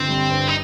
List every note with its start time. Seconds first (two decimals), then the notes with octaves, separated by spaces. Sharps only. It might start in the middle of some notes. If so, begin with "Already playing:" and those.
Already playing: G1 C4
0.09 G3
0.31 G2
0.48 D#4